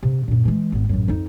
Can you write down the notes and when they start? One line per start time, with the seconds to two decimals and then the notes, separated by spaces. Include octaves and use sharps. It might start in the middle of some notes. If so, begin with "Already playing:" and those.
0.03 C3
0.28 F#2 A#2
0.45 E3 G#3
0.72 G#1 B3
0.89 A1 F#2
1.08 F2 D#4